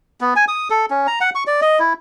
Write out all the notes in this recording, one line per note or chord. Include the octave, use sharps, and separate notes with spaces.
B3
G#5
D#6
A4
C#4
A#5
F#5
C#6
D5
D#5
E4